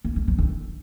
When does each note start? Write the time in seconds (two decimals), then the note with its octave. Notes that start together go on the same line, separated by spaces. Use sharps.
0.05 A#3
0.16 G#3
0.28 F3
0.39 D3